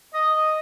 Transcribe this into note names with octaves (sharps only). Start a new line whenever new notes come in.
D#5